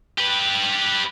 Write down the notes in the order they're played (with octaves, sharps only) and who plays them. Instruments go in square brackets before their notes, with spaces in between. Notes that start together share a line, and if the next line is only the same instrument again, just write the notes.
[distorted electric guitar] G4 B4